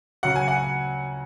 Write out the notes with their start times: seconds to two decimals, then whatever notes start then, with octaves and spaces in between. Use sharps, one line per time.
0.23 C#3 F#3 F#5
0.36 G#5
0.48 F#5